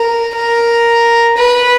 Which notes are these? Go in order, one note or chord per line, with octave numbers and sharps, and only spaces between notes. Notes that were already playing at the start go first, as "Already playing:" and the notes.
Already playing: A#4
A#4
B4